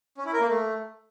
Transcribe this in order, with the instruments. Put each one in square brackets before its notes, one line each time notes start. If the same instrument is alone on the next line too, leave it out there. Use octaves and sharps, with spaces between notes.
[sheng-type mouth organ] C#4
E4
A#4
A#3
A3